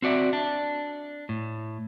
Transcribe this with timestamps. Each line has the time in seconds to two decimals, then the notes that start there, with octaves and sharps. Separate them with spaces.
0.02 C4 F#4 D5 E5
0.33 D4
1.29 A2